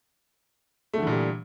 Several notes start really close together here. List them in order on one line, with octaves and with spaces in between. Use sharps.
A3 D3 E3 A#2 G3